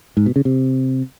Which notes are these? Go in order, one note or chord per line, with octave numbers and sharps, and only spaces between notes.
G#2
B2
C#3
C3